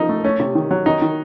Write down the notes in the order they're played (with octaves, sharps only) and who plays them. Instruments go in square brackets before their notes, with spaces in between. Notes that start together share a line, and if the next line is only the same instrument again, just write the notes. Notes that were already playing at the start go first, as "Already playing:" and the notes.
Already playing: [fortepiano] F3 D#4
A3
A3 C#4
C3
D#3
F#3
D#3 D#4
D#3